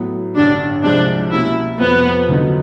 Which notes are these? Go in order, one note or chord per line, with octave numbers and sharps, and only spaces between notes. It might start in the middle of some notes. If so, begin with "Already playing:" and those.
Already playing: A2 F#3 B3
A1 G2 D3 G3 D4
C2 C3 F3 G#3 C4 D4
B2 G3 A#3 C#4 E4
F2 C3 F3 B3
D2 D3 F#3 B3 D#4